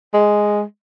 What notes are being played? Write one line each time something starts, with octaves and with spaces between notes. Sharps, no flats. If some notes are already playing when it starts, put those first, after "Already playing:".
G#3